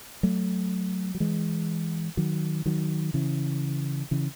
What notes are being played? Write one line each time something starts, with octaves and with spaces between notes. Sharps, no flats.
F#3 A3
F#3
E3 G#3
D#3 F#3
D#3 F#3
C#3 E3
C#3 E3